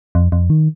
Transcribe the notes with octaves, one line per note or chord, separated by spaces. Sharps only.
F2
F2
D#3